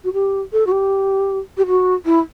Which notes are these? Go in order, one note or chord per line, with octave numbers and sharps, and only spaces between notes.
F#4
G4
A4
F#4
G4
G4
F#4
E4